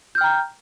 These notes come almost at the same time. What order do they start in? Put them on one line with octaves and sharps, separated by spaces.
G6 F6 G5 A#5